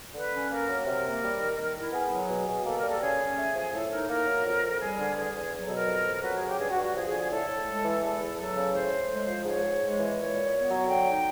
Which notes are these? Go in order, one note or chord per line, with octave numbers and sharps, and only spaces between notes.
D3 B4
C#4
A#3 A#4
F#3
C3 A#4
A#3
G3
D#3
D#3
E4
B3 G#4
F#3
B2
B2
A#3 A4
G3 A#4
A4
C#3 G#4
C#4
A3
F3
A2 A4
D#4 A#4
A#3 A#4
F#3
F2
F2
G3 G#4
D3
E2 G#4
E2
F#3
A4
B2
A#4
F2
F2
F#3 B4
G#4
C#3
G4
G2 G#4
F#4
G2
F#4
F3 G#4
G#4
D3
G#4
A2 A4
A2
G#3
E3
E2 A4
E2
F#3 A4
C#3
A2 C5
A2
G#3
F3
G#2 C#5
G#2
G#3
E3
A#2 C#5
A#2
B3
F#3
D3 G5
D#4